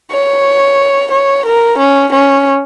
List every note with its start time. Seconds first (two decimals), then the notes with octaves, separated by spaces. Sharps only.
0.12 C#5
1.11 C#5
1.46 A#4
1.78 C#4
2.12 C#4